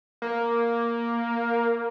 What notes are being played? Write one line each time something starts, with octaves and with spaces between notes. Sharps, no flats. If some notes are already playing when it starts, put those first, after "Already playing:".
A#3